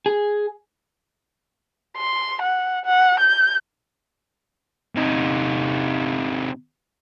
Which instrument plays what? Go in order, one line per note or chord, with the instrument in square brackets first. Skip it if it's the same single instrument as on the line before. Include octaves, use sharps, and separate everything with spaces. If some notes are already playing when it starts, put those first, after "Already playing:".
[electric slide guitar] G#4
[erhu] C6
F#5
F#5
G6
[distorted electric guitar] C3 D#4